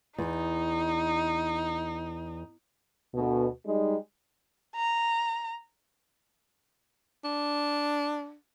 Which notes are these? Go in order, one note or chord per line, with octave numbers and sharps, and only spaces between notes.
E2 D#4
D2 B2
G3 G#3 D#4
A#5
D4